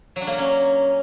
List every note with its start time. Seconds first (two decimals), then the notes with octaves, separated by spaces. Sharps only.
0.16 F#3
0.22 D4
0.27 A#3
0.33 A#4
0.38 C#4